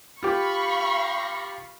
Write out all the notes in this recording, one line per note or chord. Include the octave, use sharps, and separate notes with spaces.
F4 G4 F5 B5 C#6